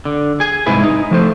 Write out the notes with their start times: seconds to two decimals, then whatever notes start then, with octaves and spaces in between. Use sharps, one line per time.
0.05 D3
0.40 G#4 G#5
0.66 C2 G#2 E4 G#4 B4
0.84 D#4
1.11 F3 A3 C5